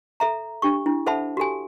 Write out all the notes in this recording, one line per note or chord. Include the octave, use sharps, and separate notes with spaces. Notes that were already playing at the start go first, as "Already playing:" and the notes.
A4 E5 A#5
D4 G4 C#6
D4 E4
A4 C5 E5 F#5 A5 B5
F#4 G4 A4 G#5